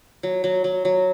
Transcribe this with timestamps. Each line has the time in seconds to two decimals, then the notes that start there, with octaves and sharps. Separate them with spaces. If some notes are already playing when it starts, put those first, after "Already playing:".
0.23 F#3
0.44 F#3
0.64 F#3
0.85 F#3